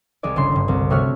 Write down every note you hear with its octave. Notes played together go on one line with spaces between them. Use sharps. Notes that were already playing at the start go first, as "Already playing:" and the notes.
C2 G#3 G#4 D5
G1 C#3 C6
G2 D3
C2
C3 A3 F#4 C#5 F6